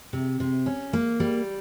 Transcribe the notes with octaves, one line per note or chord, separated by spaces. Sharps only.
C3
C3
C#4
A#3
G3